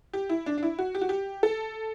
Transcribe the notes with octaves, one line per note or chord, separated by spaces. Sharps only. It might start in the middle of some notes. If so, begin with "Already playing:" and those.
G4
E4
D4
D4
E4
F#4
G4
F#4
G4
A4